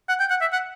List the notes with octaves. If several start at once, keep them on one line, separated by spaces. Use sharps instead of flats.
F#5
G5
F#5
E5
F#5